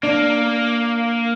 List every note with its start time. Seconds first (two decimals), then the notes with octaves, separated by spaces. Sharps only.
0.03 A#3 D4